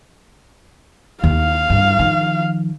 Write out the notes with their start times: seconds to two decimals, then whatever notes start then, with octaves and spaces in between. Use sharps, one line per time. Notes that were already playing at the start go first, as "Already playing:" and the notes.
1.24 D#2 F5
1.70 G2
1.99 D#3 F3